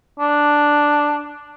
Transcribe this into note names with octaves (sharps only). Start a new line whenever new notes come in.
D4